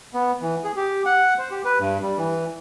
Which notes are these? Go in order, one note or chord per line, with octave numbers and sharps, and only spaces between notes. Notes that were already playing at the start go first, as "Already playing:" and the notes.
B3
E3
G#4
G4
F#5
C5
G4
B4
G2
G3
E3